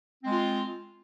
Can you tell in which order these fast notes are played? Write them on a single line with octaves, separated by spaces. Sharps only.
C4 G#3 F4